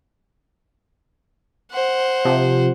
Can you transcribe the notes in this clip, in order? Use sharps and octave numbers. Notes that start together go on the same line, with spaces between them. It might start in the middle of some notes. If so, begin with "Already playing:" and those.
C5 F#5
C3 F3